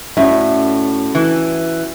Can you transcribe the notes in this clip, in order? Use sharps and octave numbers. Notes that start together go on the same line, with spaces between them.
A2 C#4 F#4 D5 E5
E3